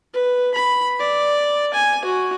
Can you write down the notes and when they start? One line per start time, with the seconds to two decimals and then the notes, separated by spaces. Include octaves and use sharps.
0.14 B4
0.55 B5
1.00 D5
1.74 G#5
2.05 F#4